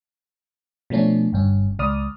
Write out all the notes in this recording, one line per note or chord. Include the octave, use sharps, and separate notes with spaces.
B2 F3 A3 C#4 D4
G1 G2 C#4
C#2 D5 D#6 F6